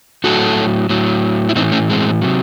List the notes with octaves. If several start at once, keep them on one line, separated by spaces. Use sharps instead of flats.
A2 F#3 F#4 A4
A2 F#3
E4
A2 E3 C4 D#4
A3 C#4
G#3 C4
C3 F#3